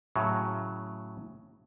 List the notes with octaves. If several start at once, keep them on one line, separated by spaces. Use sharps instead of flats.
A2 C#3 F#3